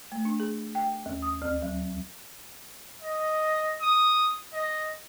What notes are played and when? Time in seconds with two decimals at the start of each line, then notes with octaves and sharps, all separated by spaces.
0.12 A3
0.25 D4
0.40 G#4
0.75 G5
1.06 D#2
1.22 D#6
1.42 D2
1.62 F#3
3.02 D#5
3.81 D#6
4.53 D#5